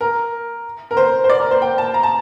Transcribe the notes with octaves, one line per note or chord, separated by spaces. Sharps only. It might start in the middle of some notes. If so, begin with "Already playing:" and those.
A#4
A#4
C5
C5
D5
A#4
C5
G5
A5
A#5
A5